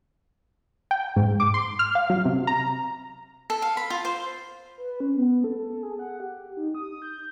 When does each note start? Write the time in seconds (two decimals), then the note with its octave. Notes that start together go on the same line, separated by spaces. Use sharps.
0.91 G5
1.16 G#2
1.40 D6
1.54 C6
1.79 F6
1.95 F5
2.10 F#3
2.25 C3
2.47 A#5
3.50 A4
3.62 F5
3.77 B5
3.90 F4
4.05 C5
4.78 B4
5.00 C#4
5.16 B3
5.44 A4
5.83 G#4
5.99 F#5
6.20 G4
6.57 D#4
6.75 D#6
7.02 G6